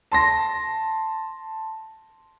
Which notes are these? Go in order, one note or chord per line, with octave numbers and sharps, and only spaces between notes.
A5 C6 A#6